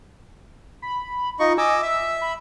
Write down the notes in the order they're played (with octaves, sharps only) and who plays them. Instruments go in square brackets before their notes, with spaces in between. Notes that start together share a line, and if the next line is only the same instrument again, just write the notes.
[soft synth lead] B5
[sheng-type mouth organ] D#4 D#5 C#6 [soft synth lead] F4
[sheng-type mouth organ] D#5 D6 E6 [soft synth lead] G#5
[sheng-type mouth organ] E5 [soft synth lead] E6
[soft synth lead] B5